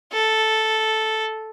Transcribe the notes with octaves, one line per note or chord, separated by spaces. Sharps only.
A4